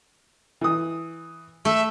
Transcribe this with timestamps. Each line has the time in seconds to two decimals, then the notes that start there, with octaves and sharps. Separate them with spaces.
0.61 E3 D#6
1.65 A3 E5